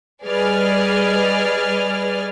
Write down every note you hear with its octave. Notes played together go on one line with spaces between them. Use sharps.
G3 G#4 B4 D5 D#5 F6